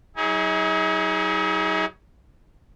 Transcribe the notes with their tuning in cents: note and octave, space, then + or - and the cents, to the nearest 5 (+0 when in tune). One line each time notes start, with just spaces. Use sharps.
F#3 +20 D#4 +45 G#4 -10